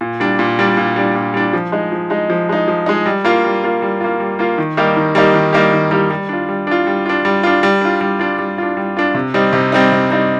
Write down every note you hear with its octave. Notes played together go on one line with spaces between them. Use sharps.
A#2
G3 D4
A#2
G3 D4
A#2
G3 D4
A#2
G3 D4
F3
G#3 D#4
F3
G#3 D#4
F3
G#3 D#4
F3
G#3 D#4
G3
A#3 F4
G3
A#3 F4
G3
A#3 F4
G3
A#3 F4
D#3
G3 A#3 D#4 G4
D#3
G3 A#3 D#4 G4
D#3
G3 A#3 D#4 G4
D#3
G3 A#3 D#4 G4
G3
D4 F4
G3
D4 F4
G3
D4 F4
G3
D4 F4
G3
D4 F4
G3
D4 F4
G3
D4 F4
G3
D4 F4
C3
G3 C4 D#4
C3
G3 C4 D#4
C3
G3 C4 D#4